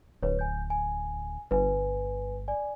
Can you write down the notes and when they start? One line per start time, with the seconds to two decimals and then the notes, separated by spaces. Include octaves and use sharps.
0.23 D1 B4 C#5
0.39 G#5 G6
0.70 G#5
1.51 G1 B4 G#5
2.48 D5 G#5